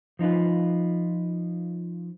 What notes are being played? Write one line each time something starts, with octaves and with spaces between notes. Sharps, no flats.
F3 D#4 F4 B4